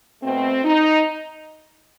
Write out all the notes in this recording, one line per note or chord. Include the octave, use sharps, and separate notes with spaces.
B2 A3 C4
D#4